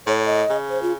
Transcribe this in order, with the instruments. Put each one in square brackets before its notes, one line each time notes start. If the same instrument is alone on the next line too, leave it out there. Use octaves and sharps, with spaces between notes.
[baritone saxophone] A2 [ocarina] C#5
[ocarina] D#5
[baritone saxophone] C#3
[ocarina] C5
F4